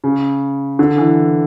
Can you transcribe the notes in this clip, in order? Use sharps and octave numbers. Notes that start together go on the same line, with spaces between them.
C#3
D3
E3